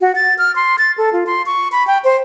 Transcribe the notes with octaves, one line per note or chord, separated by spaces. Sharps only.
F#4
A6
F6
C6
A6
A4
F4
C6
C#6
B5
G5
C5